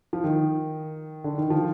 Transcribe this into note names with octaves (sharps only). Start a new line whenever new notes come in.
F3
D#3
D3
D#3
F3